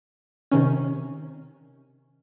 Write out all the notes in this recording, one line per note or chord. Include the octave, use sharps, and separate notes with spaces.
C3 D#3 C#4